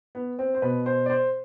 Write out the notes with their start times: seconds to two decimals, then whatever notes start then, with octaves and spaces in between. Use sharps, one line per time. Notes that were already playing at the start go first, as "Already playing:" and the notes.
0.15 B3
0.39 C4
0.55 C5
0.62 B2 B4
0.86 C5
1.06 D5
1.10 C5